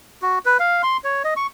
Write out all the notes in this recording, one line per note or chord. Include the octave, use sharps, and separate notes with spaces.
F#4
B4
F5
C6
C#5
D#5
C#6